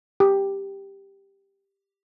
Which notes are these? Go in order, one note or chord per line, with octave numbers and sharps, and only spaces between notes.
G4